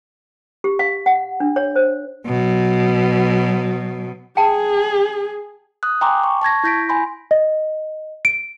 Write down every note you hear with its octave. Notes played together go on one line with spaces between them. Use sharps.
G4
F5
F#5
D4
C#5
C5
B2 F#3
G#4 G5 A5
D#6 F#6
G5 G#5 A#5 C6 D6
C#6
A5 C#6 G#6 A#6
E4 G6 A#6 B6 D7
G#5 B5 C6
D#5
D7